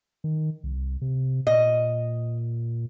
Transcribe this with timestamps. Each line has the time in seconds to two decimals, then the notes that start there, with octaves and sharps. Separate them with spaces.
0.24 D#3
0.63 C2
1.02 C3
1.47 A#2 D#5